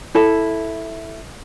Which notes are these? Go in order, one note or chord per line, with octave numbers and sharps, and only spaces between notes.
E4 A4 A5